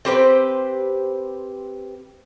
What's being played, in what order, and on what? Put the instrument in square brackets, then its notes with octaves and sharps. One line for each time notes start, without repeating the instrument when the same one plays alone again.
[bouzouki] C4 G4 B4 C5